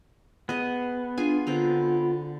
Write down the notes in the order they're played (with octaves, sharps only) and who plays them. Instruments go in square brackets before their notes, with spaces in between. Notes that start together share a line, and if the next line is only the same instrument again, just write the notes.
[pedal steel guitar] B3 [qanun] G#4 D#5
[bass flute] D4 [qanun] F4 G#4 G#5
[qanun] D3 C4 A#5 [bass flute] F4